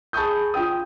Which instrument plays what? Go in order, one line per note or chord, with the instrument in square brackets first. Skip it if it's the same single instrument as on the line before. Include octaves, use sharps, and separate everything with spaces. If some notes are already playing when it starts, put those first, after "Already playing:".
[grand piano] G#4 A5 B5 C#6 D#6 G6
F4 G5 D#6